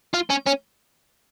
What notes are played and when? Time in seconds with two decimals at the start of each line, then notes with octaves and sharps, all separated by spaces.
0.14 F4
0.30 C#4
0.47 C#4